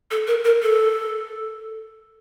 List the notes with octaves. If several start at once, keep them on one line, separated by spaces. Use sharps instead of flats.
A4
A#4
A#4
A4